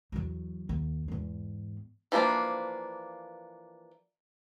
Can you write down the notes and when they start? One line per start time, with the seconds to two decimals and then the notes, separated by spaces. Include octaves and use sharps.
0.12 E2 F#3
0.69 D#2
1.08 E2 G#2
2.12 E3 F3 G3 A#3 D4